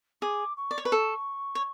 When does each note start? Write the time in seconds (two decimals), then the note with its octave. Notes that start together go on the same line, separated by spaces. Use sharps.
0.22 G#4 D6
0.57 C#6
0.71 D5
0.78 C#5
0.85 B4
0.92 A4
1.55 C#5